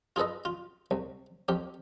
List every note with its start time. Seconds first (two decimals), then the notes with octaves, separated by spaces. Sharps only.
0.16 F4 G#4 A4 B4 D#5
0.45 F4
0.91 C2
1.48 F2 G4